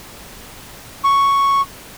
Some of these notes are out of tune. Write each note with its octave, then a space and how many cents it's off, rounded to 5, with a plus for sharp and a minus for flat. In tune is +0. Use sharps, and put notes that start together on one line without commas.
C#6 +0